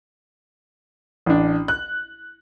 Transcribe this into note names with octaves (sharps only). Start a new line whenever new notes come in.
A1 D4
F#6